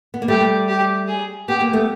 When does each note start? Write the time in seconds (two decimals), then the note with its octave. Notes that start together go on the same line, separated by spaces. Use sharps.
0.14 B3
0.22 A#3
0.28 G3 A3 G4
0.68 G4
1.08 G#4
1.48 B3 G4
1.61 A#3
1.73 A3 B3